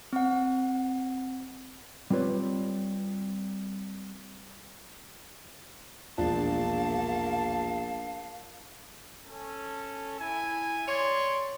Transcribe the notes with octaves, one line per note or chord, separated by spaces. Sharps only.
C4 F#5
G3 C4 F4 B4 C#5 D5
E1 A#1 F3 D4 A#4 F5 A5
C#4 A4
E4 G#5
G3 C#5 D5 C6